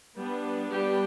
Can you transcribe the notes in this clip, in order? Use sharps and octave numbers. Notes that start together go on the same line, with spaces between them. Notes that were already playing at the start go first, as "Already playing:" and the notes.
G3 B3 D4
G3 G4